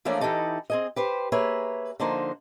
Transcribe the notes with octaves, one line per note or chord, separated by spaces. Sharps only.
E3 F3 A3 A#3 C#4 D4
E3 D#4 E4 G4 A4 D#5
C4 G#4 D#5
G4 B4 C5
A#3 G#4 B4 C#5 E5
D3 F3 A#3 D#4 C5